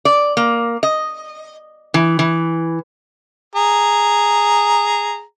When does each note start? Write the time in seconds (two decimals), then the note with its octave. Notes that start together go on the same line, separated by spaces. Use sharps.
0.05 D5
0.37 A#3
0.83 D#5
1.94 E3
2.19 E3
3.56 G#4 A#5